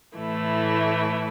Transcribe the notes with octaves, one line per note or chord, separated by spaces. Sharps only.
A2 E3 A3 E4